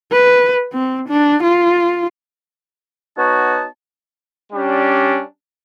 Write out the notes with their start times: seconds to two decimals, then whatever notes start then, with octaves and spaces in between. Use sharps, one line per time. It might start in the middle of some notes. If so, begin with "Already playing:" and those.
0.12 B4
0.73 C4
1.08 D4
1.43 F4
3.18 B3 D#4 F#4 C#5 A5
4.53 G3 C#4 D4